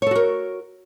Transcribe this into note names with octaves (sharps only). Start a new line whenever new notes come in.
F#4 A4 A#4 C#5